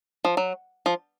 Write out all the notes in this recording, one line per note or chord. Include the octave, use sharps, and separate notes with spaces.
F3
F#3
F3